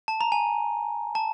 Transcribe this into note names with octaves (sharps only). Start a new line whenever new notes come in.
A5
A#5
G#5
A5